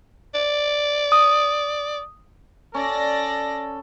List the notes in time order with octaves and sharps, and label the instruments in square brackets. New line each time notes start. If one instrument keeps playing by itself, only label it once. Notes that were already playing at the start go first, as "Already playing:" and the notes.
[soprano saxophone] D5
[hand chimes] D#6
[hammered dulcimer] C#4 [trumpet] A4 [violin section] D5 A#6